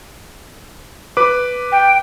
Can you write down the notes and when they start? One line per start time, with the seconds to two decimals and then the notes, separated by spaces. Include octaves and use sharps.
1.17 B4 D6
1.72 G5